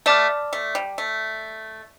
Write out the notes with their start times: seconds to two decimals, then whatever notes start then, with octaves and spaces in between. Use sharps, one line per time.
0.06 A3 D5 A5 D6 F6
0.53 A3
0.75 G3
0.98 A3